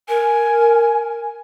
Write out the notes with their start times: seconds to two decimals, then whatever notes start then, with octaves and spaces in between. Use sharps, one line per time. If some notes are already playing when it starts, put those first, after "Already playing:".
0.09 A#4 G#5